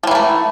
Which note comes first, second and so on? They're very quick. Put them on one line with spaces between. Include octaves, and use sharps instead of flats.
F3 E3 A#3 A3